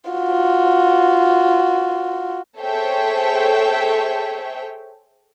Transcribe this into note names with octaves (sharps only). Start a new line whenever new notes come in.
F4 F#4
G#4 A4 C5 C#5 E5 G5